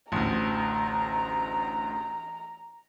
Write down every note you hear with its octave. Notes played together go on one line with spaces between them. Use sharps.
A1 D2 A#5